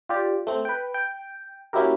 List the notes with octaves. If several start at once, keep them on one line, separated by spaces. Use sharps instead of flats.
F4 G4 D5
A3 C4
B4 G5
G5
A#3 C#4 E4 F#4 G4 A#4